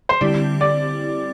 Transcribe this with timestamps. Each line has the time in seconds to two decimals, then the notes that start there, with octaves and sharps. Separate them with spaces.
0.09 C5
0.21 D3 G3 C4 E4 G4 D5
0.61 D5